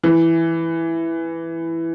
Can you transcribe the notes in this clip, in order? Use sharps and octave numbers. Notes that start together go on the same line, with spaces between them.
E3